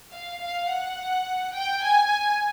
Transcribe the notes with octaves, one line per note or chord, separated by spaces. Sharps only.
F5
F5
F#5
G5
G#5